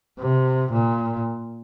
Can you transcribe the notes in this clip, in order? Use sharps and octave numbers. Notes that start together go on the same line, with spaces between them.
C3
A#2